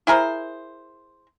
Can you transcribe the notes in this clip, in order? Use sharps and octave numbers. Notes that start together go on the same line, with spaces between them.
E4 G#4 A#4 C5